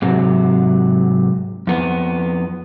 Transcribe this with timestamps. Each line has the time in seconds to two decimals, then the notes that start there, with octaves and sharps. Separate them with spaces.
0.02 G#2 C3 F#3
1.67 F2 B3